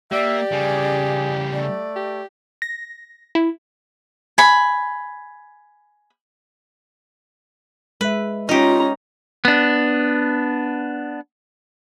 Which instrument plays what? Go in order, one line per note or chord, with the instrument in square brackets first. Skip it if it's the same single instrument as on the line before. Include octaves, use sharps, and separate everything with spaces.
[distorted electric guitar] A#3 [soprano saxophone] G4 [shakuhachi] D5 [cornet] E5
[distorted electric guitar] C#3 G3 [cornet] G#4
[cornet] A3 [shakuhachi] D5
[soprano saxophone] G4
[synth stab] A#6
E4
[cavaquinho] G#5 B5
[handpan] G#3 E5 [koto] B4
[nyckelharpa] C#4 A#5 [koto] D#4 G4 [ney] F4
[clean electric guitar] B3 D4